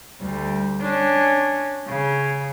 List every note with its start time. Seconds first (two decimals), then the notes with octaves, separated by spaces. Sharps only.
0.21 D2 G3
0.82 C#4 D4
1.88 C#3